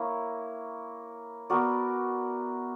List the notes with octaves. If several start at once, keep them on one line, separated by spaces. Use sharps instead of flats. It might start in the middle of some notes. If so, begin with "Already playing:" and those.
Already playing: A#3 E4 A#4 C#5
B3 F#4 A#4 D5